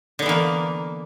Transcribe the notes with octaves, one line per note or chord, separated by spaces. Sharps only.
D3 E3 A#3 B3